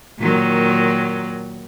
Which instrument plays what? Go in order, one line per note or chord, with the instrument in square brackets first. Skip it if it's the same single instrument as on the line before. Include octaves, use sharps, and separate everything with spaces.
[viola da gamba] A#2 D#3 F#3